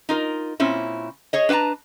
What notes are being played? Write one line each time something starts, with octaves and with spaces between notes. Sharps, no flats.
D#4 F4 A#4
A#2 C4 C#4 E4
G#4 C#5 D#5
D4 B4 F#5 A5 A#5